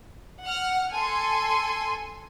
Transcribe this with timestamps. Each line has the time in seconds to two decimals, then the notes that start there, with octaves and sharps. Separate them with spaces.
0.45 F#5 F6
0.93 A4 G#5 C6